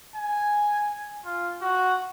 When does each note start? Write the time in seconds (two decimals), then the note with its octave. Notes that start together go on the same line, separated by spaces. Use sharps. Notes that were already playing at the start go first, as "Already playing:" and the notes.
0.16 G#5
1.26 F4
1.61 F#4